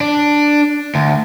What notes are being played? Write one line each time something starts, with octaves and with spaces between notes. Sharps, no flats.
D4
D2